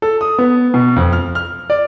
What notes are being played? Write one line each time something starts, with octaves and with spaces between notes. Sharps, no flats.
A4
D#6
B3
B2
F2
F6
F6
D5